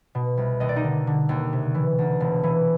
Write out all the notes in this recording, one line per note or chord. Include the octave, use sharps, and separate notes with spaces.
B2
C2
D#2 D#5
D5
D#4 D#5
D3
D3
D#2
C3
E3
D2
E1
E3